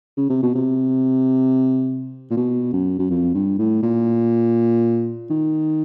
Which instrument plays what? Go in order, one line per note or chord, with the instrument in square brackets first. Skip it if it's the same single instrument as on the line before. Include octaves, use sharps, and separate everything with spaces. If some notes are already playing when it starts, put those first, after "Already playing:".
[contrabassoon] C#3
C3
B2
C3
A#2
B2
F#2
F#2
F2
G2
A2
A#2
D#3